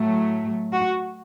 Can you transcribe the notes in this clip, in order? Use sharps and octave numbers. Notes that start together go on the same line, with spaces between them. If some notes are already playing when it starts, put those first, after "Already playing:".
Already playing: A2 F#3 A3
F#4